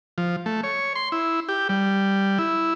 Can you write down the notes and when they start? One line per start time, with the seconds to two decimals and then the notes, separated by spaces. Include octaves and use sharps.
0.18 F3
0.46 A3
0.63 C#5
0.96 C6
1.12 E4
1.49 G4
1.69 G3
2.39 E4